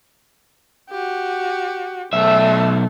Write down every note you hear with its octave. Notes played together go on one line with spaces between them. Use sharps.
F#4 G4
B1 A3 E5